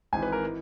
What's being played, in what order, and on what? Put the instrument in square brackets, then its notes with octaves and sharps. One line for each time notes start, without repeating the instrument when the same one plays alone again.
[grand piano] G#1 G#2 E3 G#5
B4
A#4
E3